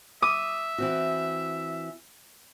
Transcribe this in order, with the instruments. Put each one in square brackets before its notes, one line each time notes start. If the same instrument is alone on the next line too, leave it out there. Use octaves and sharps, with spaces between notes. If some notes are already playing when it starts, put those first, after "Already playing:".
[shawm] E5 [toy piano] D6 [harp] D#6
[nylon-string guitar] E3 C4 F#4